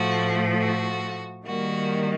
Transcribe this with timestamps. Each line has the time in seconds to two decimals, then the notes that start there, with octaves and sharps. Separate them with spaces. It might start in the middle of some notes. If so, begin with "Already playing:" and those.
Already playing: A2 F3 A3 F#4
0.60 F#4
1.45 D#3 G3 A#3 F#4